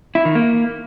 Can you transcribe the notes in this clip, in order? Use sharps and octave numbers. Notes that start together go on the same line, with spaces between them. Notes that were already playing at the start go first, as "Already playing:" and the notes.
E4
D#3
A#3